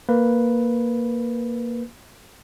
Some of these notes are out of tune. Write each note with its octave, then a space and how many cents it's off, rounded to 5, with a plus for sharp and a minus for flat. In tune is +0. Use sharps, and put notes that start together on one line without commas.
A#3 +0 B4 +0